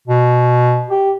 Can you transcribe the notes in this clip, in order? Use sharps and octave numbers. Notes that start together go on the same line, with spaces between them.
B2
G4